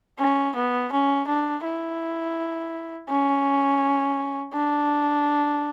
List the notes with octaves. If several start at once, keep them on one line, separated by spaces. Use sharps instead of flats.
C#4
B3
C#4
D4
E4
C#4
D4